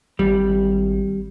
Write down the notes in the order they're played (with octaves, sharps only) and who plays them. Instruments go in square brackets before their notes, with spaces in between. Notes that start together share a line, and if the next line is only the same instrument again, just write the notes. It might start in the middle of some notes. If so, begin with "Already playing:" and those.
[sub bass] G#1 [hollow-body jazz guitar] G3